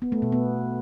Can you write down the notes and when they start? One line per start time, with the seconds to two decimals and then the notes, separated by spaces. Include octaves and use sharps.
0.02 B3
0.12 A3
0.22 B2
0.32 B3